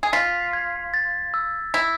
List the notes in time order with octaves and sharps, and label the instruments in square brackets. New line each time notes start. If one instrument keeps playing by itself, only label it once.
[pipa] G#4
[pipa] F4 [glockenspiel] B6
[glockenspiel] G#6
A6
E6
[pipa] E4 [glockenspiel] B6